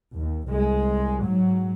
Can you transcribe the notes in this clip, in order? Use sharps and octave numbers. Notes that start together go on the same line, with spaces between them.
D#2
C2 G#3
G#2 F#3